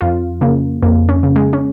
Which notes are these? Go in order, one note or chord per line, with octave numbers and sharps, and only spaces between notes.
F2 F4
C#3 A#3
F2 A#3
C#4
C#3
G#3
C#4